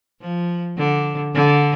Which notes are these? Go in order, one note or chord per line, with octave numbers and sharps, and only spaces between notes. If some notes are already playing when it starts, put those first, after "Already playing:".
F3
D3
D3